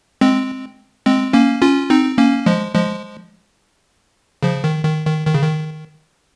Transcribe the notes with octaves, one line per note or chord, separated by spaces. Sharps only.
G#3 C4
G#3 C4
A#3 C#4
C#4 F4
C4 D#4
A#3 C#4
F3 G#3
F3 G#3
C#3 F3
D#3
D#3
D#3
D#3
C#3
D#3